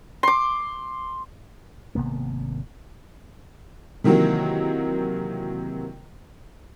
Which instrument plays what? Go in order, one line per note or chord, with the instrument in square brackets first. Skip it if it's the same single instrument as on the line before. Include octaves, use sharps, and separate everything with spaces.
[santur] C6 D6
[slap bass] G#1 C3 A#3 B3
[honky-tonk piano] C3 D#3 E3 F#3 A#3